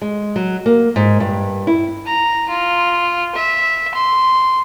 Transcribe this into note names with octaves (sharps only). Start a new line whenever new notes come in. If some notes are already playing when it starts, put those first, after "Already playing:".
G#3
F#3
A#3
G#2
G2
E4
A#5
F4
E5
C6